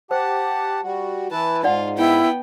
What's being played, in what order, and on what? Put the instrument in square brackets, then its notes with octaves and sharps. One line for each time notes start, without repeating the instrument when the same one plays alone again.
[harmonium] G4 F#5 A5 [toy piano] C5
[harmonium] G3 F#4
[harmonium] E3 E4 B4 [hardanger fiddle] A5
[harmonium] G#2 [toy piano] D#4 D5 F#5 [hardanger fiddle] F4
[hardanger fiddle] B3 G5 [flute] E4